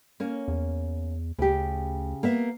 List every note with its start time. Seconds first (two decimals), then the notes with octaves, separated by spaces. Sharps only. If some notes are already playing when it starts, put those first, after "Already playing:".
0.20 A#3 C#4
0.48 E2
1.38 D2 C#3 G4
2.23 A#3 B3 E5